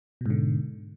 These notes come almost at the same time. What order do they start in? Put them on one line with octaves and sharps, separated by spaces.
B2 G#2 D3